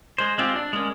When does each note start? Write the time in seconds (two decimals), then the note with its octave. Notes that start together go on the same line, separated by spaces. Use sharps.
0.18 G#3 C5
0.38 G#3 C4 F4 G4
0.56 D4
0.73 G#3 A#3 C#4